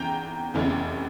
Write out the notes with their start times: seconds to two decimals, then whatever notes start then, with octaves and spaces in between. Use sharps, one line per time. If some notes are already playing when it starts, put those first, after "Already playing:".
Already playing: E2 C#3 G5 A#5
0.54 F1 E2 C#3 E3